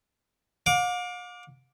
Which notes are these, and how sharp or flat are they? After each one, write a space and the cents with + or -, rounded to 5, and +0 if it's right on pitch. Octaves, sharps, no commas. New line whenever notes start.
F5 +45 D6 +0